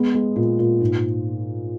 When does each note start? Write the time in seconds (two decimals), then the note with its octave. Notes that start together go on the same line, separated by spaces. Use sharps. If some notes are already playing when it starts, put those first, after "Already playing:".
Already playing: G#3 B3
0.15 G#3
0.36 A#2
0.59 A#2
0.81 G#2